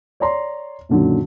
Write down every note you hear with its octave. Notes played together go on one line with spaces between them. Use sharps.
C#5 D5 A#5 C6
F#2 A#2 D3 D#3 F#3